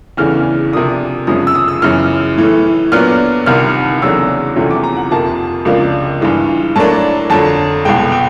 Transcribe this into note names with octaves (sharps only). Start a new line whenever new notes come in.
E2 C#3 E3 A3 D4 F6
C3 F3 A#3 D4 D#6
F#2 C#3 F3 G#3 C#4 D#6
E6
D#6
E6
F#2 C#3 E3 F6
A2 E3 A3
A#2 F#3 B3 D4 F6
C2 C3 D#3 F6
E2 C#3 F#3 A3 D4 E6
E2 C3 F3 A3 C#4
D6
A#5
F#5
F2 C3 F3 A#3 A5
C#2 C#3 F3 A#3 D4
G2 E3 G#3
A2 F#3 A#3 D4 A5
F2 D3 F#3 A5
C2 B2 G#3 G5
G5